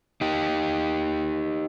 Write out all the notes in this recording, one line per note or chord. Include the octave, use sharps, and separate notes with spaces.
D#4 G4